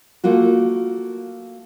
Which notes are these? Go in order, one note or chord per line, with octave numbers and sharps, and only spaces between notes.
A3 A#3 F4 F#4